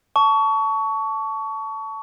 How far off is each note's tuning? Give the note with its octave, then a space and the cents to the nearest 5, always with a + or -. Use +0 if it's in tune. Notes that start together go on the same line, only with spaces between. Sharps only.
A5 +5 C#6 +25